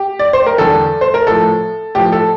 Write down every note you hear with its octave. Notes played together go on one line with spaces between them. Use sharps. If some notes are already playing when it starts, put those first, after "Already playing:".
Already playing: G4
D5
C5
A#4
E2 D3 G3 A4
C5
A#4
A2 F3 A4
A2 F3 G4
A4